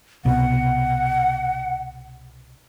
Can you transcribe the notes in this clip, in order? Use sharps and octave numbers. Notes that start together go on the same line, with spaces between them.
C2 B2 F#5